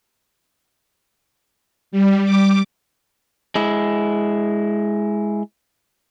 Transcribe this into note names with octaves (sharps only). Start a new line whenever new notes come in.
G3
D6
G#3 E4